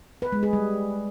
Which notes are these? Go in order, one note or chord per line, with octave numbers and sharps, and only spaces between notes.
B4
G#3
G#4
G3